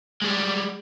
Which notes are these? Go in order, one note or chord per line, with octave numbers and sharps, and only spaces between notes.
G3 G#3